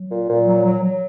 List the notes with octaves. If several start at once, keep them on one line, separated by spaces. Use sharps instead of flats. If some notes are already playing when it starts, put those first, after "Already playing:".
Already playing: F#3
A#2
A#2
F#3
F#3
F#3